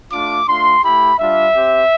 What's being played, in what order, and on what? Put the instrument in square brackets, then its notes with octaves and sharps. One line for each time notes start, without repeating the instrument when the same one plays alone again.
[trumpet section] A3 D4 F4 D6
A3 D4 F4 C6
A3 E4 G4 B5
G3 D4 F4 E5
C4 G4